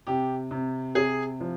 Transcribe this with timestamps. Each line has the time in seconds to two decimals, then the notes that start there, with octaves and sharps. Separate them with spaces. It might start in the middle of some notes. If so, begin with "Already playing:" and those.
0.07 C3 G4
0.51 C3
0.95 C3 G#4
1.40 F3